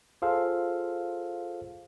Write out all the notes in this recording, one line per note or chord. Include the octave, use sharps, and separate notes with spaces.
F4 G#4 A4 C5 F5